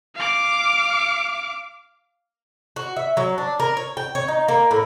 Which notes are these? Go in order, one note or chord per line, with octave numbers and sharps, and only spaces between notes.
F5 D6
F#4
E5
F#3
D4
A#4
C#5
G5
C#5
D#4
A#3
A2